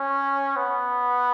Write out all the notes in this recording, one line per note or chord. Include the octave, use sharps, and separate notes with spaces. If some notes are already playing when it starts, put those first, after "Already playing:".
Already playing: C#4
B3